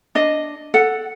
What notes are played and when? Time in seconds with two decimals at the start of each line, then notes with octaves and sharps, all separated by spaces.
0.15 D4 D#5
0.74 A4 F#5